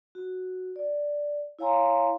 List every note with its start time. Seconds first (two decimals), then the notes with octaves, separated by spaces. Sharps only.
0.15 F#4
0.76 D5
1.59 E4 C#5 F5 G#5 A#5 C6